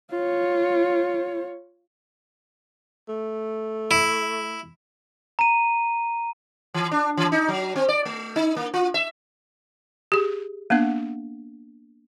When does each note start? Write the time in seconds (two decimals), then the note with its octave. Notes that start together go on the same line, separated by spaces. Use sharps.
0.10 F4 C#5
3.09 A3
3.91 E4
5.39 A#5 D#7
6.74 E3
6.91 D4
7.17 E3
7.32 D#4
7.48 F#3
7.76 C4
7.89 D5
8.05 A3
8.36 D#4
8.56 A#3
8.74 F4
8.94 E5
10.12 G4 G#4
10.70 A#3 B3 D4 F#5